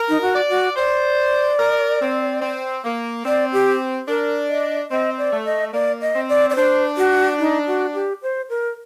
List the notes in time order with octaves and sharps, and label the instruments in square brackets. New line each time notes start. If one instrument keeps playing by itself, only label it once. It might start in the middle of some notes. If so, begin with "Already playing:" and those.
Already playing: [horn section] A#4
[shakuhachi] D#4
F#4
[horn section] D5
[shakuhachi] F#4
[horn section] C5 [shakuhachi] D5
[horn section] A#4
C4
C4
A#3
[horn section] C4 [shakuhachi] D5
[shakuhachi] G4
[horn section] D4 [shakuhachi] A#4
[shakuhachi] D#5
[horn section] C4 [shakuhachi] D#5
[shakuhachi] D5
[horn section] A3
[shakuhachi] D#5
[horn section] A#3 [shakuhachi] D5
[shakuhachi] D#5
[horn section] C4
[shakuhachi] D5
D5
[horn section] D4 [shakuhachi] C5
[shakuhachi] F#4
D#4
F#4
G4
C5
A#4